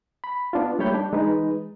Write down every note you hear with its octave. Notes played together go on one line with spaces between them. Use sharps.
B5
B3 D4 F4
G3 A3 A#3 C#5 B5 G6
D4
E3 G#3 D#4 B4